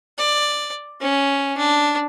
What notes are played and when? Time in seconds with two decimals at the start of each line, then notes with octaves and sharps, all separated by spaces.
0.18 D5
1.01 C#4
1.57 D4